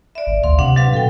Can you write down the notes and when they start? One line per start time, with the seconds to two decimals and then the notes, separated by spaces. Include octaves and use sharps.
0.15 D5 E5
0.27 G#1
0.43 D2 F5 C6
0.59 C3 D4 F#5
0.76 F#3 B4 F5
0.94 B2 A4 G5